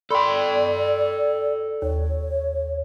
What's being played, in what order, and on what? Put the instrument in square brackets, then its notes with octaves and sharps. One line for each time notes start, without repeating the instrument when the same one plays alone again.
[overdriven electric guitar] A4 G5 [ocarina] D5 [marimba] B5 C6
[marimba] D#2 [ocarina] C#5